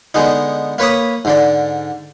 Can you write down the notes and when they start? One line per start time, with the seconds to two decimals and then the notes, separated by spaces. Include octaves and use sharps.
0.14 D3 G#3 B3 D#4
0.78 A#3 B4 C#5 B5 D#6
1.25 G#2 D3 D5